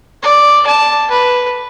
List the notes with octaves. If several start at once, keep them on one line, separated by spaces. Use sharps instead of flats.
D5
A5
B4